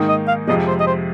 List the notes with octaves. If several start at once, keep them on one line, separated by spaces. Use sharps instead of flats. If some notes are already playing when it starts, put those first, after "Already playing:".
Already playing: G#2 D#3 A#3 D#4
D#5
F5
F2 C3 F3 G#3 D#5
C5
D#5
C5